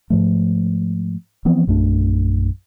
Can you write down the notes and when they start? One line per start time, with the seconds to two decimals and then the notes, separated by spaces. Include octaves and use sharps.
0.10 G#2 F3 A3
1.45 E3 F3 B3 C4
1.67 A#1 F#2 A3 D4